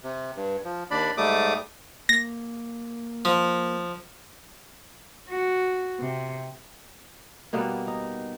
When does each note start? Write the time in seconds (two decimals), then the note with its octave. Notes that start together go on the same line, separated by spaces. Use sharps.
0.03 C3
0.36 G2
0.65 F3
0.91 D#2 D4 D5 B5
1.17 G#2 G3 A3 D6 D#6
2.09 A#3 A#6
3.25 F3
5.30 F#4
6.00 C3
7.53 B2 G3 A#3 B3
7.87 D#4